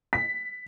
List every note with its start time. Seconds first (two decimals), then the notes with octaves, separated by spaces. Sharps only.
0.13 B6